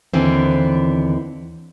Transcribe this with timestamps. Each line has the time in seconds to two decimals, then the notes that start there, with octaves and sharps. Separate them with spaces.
0.13 D#2 D3 E3 B3 C4